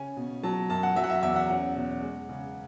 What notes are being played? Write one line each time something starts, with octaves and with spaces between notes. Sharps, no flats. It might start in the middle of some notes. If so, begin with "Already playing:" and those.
Already playing: C#3 C#4 G#5
B2
F#3 A5
F#2 A5
F#5
F#3 E5
F#5
E5
E2 E5
F#5
C#4 F#5
B2
G#3
C#3